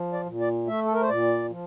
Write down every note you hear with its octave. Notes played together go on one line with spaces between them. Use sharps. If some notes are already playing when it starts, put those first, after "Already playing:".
Already playing: F3
D5
A#2
D5
A3 E5
A4
A#4
C5
A#2 D5
F3